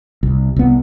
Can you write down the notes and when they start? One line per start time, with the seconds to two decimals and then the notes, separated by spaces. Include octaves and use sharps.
0.23 C2
0.56 C2 B3